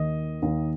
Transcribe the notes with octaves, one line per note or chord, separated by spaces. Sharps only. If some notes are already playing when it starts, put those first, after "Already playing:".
Already playing: D#2 D#3 D#5
D#2 D#3